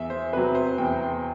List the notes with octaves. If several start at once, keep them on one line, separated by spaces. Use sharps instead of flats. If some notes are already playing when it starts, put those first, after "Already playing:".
Already playing: E2 E5
C5
C3 F#3 B4
C5
E2 G5